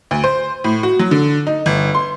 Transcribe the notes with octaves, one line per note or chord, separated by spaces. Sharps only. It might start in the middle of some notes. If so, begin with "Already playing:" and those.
D2
C5
A2
F#4
F#3
D3
D#4
G1
C6